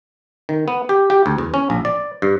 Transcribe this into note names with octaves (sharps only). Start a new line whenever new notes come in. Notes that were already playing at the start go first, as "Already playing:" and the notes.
D#3
B3
G4
G4
D2
E2
C#4
A#1
D5
G2